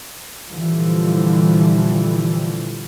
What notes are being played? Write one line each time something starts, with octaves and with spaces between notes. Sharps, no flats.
A#2 D3 E3 F3 G3